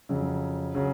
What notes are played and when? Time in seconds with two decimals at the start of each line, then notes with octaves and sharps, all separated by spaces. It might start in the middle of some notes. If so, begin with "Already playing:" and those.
0.09 F2 C#3 F#3
0.75 C#3 F#3